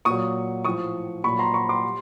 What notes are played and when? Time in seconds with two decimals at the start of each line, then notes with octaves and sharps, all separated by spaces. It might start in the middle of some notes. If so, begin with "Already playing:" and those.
0.05 A#2 F#3 C#6 D#6
0.64 A2 F3 C#6 D#6
1.24 A#2 F#3 B5 C#6
1.39 A#5 C6
1.54 B5 C#6
1.69 C6 D6
1.83 G3